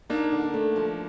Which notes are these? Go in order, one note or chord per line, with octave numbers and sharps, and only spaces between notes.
A#3 D4 D#4
D3
A3
F3